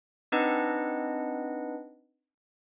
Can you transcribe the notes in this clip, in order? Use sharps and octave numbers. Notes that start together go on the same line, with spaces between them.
C4 D4 D#4 B4 D#5 F#5